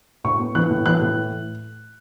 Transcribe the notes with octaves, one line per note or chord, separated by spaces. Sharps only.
A2 C#6
B3
E3 F#6
A2
E3 F#6
A2